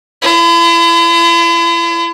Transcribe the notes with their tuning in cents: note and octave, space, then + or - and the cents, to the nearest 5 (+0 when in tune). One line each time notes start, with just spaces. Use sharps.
E4 +40